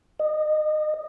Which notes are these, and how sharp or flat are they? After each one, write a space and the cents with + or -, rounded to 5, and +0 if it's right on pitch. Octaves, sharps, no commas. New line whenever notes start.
D#5 -25